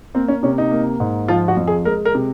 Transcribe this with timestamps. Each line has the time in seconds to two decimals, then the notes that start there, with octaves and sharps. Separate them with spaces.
0.14 A#3 C4
0.28 C#4
0.43 C3 C#4
0.58 D#4
0.71 A#3
1.00 G#2
1.28 F3 F4
1.48 F#4
1.57 F2
1.68 G#4
1.85 G#3 A#4
2.05 A#4
2.15 C3